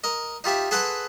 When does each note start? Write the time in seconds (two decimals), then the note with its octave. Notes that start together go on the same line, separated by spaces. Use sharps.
0.04 A#4 D#5
0.44 D#4 F4 G4 E5
0.71 G#4 A4 B4 F#5 B5 C6